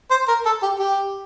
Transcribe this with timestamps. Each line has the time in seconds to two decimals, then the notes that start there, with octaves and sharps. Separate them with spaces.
0.11 C5
0.28 A#4
0.46 A4
0.63 G4
0.79 G4